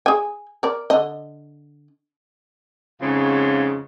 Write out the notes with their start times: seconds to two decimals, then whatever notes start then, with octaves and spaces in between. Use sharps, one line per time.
0.06 G#4 G#5
0.63 A#4 D5
0.90 D3 D#5
3.01 F2 G#2 C#3